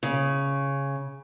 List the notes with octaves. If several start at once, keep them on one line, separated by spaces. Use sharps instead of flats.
C#3